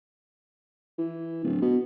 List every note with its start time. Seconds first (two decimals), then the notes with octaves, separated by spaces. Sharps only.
0.98 E3
1.44 D1
1.62 B2